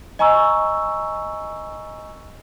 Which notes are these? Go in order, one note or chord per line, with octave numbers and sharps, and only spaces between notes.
D#5 G#5 A#5 C#6 E6